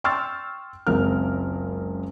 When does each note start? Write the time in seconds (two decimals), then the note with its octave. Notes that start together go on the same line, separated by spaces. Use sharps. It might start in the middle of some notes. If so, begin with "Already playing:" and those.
0.04 G5 C6 C#6 E6 F6 A6
0.87 F#1 C#2 C4 A#4 F6